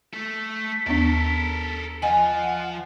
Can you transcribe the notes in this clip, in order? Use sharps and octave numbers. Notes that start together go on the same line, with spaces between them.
A3 A4 B6
D#2 B3 D4 A4 A#4
F3 F4 D#5 F#5 G#5